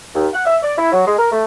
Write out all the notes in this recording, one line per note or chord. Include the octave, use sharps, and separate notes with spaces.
D#2
F#5
E5
D5
E4
F#3
G#3
A#4
A3